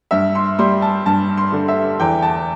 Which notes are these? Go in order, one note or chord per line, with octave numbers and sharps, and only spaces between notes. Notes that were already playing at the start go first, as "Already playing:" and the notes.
G2 E5
C6
G3 C6
A5
G2 A5
C6
D3
E5
E2 G5
A5